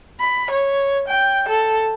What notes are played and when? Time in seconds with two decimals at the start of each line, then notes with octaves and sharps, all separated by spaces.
0.20 B5
0.50 C#5
1.08 G5
1.48 A4